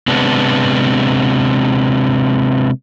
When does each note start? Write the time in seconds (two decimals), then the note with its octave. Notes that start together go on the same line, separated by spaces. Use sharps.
0.08 C3 G#3 B3 D4